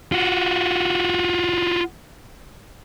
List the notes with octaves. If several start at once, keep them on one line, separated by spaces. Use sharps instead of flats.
F4 F#4